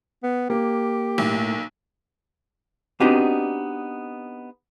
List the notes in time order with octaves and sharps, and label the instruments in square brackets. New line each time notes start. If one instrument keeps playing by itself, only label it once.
[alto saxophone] B3
[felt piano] A#3 [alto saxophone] G4
[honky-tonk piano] B1 [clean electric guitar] A2
[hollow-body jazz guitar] B3 C4 D4 D#4 F#4 G4